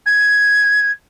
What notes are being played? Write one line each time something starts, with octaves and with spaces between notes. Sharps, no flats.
G#6